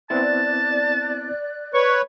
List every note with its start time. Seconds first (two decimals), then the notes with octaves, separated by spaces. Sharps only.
0.10 B3 C4 E4 D5 A5 F#6
1.74 B4 C#5 C#6